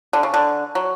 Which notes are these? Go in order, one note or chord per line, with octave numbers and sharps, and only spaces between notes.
D3
C#3
D3
F#3